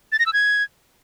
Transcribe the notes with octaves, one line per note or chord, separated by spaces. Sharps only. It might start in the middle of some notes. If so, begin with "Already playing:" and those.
A6
A#6
E6
G#6